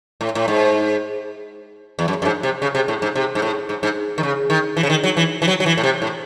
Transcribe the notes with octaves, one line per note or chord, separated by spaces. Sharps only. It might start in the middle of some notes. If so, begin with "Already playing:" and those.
A2
A2
G#2
E2
F#2
F#2
G#2
C3
C#3
C3
A2
G#2
C3
G#2
A2
G#2
G#2
D#3
C#3
D#3
E3
C#3
D#3
F#3
E3
E3
F#3
F#3
E3
A2
C3
A2